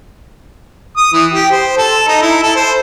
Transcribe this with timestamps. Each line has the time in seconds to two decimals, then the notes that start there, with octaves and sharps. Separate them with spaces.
0.97 D#6
1.13 E3
1.33 G4
1.51 C5
1.78 A4
2.08 D#4
2.22 E4
2.43 A4
2.56 C5